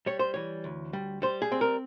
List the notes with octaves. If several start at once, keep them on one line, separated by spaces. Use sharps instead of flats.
G3 C#5
C5
E3 C#5
D2
G3
G3 C5
G#4
C4
A#4